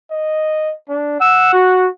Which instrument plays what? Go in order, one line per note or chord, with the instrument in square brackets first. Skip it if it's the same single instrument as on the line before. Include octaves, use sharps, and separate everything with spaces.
[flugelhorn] D#5
D4
[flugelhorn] F#5 [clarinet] E6
[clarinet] F#4